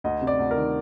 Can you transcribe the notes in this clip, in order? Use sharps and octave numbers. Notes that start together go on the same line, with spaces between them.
D2 D#5
C3
D5
D2
D#3 A#4